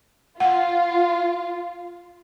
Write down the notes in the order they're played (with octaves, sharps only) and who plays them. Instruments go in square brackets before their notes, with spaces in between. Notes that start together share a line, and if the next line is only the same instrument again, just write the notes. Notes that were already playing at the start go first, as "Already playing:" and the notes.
[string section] F4 [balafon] F#5